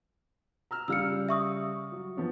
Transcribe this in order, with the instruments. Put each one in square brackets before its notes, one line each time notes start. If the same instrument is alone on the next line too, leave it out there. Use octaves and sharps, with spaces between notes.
[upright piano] A#5 E6 F6
[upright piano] C#3 G3 F5 [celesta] E6 F6 C#7
[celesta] E5 C#6 D#6
[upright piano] F#3
F3 B3 C#4